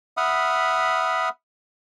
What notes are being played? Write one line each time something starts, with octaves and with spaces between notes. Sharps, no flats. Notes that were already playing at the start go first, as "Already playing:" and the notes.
E5 F#5 B5 D#6 F6